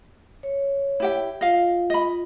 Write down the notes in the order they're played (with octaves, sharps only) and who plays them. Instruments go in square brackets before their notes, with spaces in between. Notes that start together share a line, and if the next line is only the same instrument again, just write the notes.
[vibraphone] C#5
[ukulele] E4 G4 G5
[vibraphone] F4 [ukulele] D#5 F5
[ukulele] D#5 B5